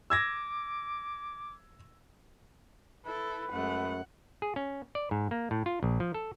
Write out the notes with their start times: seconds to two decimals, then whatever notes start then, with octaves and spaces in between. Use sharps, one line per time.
0.10 D6 E6 G#6 A#6
3.06 E4 A4 B4
3.52 F#2 G#3 A3 F#5
4.42 G#4
4.56 C#4
4.95 D5
5.11 G#2
5.31 A#3
5.51 A2
5.66 F4
5.83 A#1
6.00 F3
6.14 A4